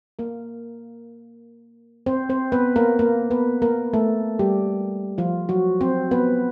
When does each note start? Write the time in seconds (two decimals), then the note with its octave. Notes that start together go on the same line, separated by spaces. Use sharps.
0.19 A#3 A#4
2.06 C4 C5
2.29 C4 C5
2.52 B3 B4
2.76 A#3 A#4
2.99 A#3 A#4
3.30 B3 B4
3.62 A#3 A#4
3.93 A3 A4
4.39 G3 G4
5.18 F3 F4
5.49 F#3 F#4
5.81 C4 C5
6.11 B3 B4